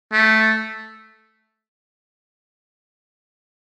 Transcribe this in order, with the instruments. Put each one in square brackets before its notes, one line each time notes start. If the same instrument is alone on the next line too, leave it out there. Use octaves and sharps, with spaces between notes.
[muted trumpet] A3